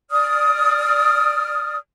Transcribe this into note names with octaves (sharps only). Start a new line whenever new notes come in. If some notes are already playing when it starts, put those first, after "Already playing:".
D5 D#6 F6